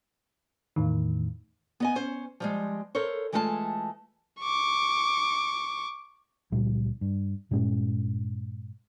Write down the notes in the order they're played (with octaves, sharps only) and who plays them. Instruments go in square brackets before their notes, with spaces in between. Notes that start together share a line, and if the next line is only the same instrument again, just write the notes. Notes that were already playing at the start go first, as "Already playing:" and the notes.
[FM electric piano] E2 A2 D#3
[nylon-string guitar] B3 D#5 G#5
C#4 C5
F3 G3 G#3
A4 A#4 C5 C#5
E3 G#3 A3 F4 E5 A5
[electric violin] C#6 D6
[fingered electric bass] C#2 A#2 F3 G3
G2
G2 A#2 G#3 C#4